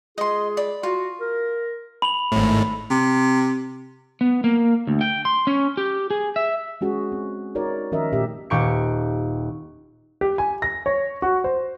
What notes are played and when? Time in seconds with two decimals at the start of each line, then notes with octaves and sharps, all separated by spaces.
0.18 G#3 F4 G#4 D#5 C6
0.57 D5 B5
0.83 F4 F#4
1.20 A#4
2.02 B5 F7 F#7
2.32 G#1 A2
2.90 C3
4.21 B3
4.44 A#3
4.87 D2
5.01 G5
5.25 C6
5.47 C#4
5.77 G4
6.11 G#4
6.36 E5
6.81 G#3 C#4 F#4 G#4
7.12 C4
7.55 D#4 F#4 A#4 C#5 D5
7.92 D#3 F3 C#4 A#4 D#5 E5
8.12 A#2 A3 C#4 G4 E5
8.50 D#1 G4 C#6 C#7
10.21 G4
10.38 G#5
10.62 A#6
10.86 C#5
11.22 F#4
11.44 C5